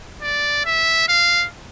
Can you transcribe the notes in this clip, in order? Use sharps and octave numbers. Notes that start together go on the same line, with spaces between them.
D5
E5
F5